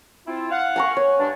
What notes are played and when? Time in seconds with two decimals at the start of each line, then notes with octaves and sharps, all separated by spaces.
0.27 C4 E4 F4
0.51 F5 F#5
0.76 G#5 A#5 C#6
0.97 C#5
1.19 G2 D4